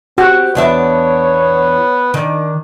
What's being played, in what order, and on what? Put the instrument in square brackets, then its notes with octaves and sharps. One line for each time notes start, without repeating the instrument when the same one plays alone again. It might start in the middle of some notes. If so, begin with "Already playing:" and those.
[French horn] C4 [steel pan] F#4 [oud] G4
[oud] E2 D4 E5 [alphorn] B3 [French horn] C#5
[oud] D#3 [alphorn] D4